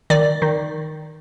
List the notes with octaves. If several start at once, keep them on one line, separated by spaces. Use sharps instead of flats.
D#3 D5
D#3